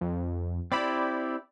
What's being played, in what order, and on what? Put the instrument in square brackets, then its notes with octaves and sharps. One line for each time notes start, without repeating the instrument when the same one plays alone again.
[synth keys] F2
[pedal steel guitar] C4 E4 G4 [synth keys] D5 B5